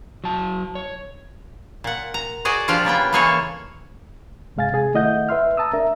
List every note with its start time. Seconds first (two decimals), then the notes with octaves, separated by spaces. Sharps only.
0.24 F#3 A5
0.75 C#5
1.84 A#2 F#5
2.14 A#5
2.45 F#4 G#4 D5 D#5
2.68 F3 D4 F4 G4 D5
2.85 C#3 A#3 B3 G5
3.13 E3 G#3 A#3 G#4 A4 C#5
4.56 G2 C3 G#3 F5 G#5 A6
4.73 C3 G#4 G#5
4.94 D#3 A3 E4 D#5 F#5 G6
5.29 B4 E5 C6 F6
5.57 A5 A#5 D#6 E6
5.73 D4 A#4 E5 A#5